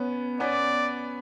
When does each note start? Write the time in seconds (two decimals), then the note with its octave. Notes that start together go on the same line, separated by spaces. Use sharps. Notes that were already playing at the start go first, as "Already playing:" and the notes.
Already playing: B3 C#4
0.40 B3 C#4 D5